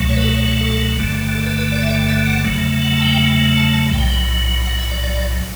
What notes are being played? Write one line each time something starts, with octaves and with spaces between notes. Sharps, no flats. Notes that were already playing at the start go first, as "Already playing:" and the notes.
Already playing: C#2 B2 F#3 A3
C#5
B4
A4
C#5
C#5
A4
G1 G2 D3 A3
A4
B4
B4
D5
E5
D5
E5
F#5
E2 C#3 F#3 A3
F#5
A5
G5
A5
A5
B1 A2 F#3 G5
F#5
E5
D5
D5